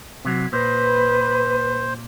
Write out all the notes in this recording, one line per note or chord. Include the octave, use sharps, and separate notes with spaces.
C3 F#3
A#2 B4 C5